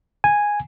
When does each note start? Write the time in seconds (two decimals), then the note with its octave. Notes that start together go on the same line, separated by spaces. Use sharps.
0.24 G#5